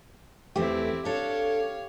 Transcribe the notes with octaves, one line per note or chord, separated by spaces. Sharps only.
E2 A3 C4 E4 G4
D4 A4 C#5 F5